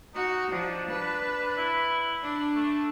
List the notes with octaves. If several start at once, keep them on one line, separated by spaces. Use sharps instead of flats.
D#4 F#4
F3 D4
B4
E4
D4
A3